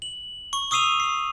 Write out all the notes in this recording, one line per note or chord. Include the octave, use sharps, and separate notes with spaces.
F#7
C#6
C#6 D#6 E6 C7 D#7 F7
C7